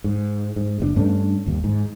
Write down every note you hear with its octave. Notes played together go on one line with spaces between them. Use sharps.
G#2
G#2
F#1 A#2 D4
G2 A3 C#4 D4
G1 D#2
G#2